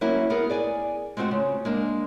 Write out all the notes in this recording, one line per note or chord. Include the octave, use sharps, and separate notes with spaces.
F#3 A#3 C#4 E4
B3 G#4 A#4
G#4 D5 G#5
G#3 A3 C4 F4 F#4
C#3
G#3 A#3 D4